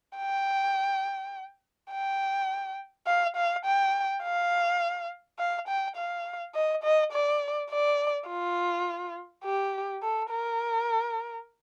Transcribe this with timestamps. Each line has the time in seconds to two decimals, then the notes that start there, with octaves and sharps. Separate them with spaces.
0.17 G5
1.92 G5
3.07 F5
3.36 F5
3.65 G5
4.23 F5
5.39 F5
5.68 G5
5.96 F5
6.55 D#5
6.84 D#5
7.13 D5
7.70 D5
8.28 F4
9.44 G4
10.03 A4
10.31 A#4